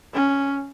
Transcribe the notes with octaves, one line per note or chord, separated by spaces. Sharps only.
C#4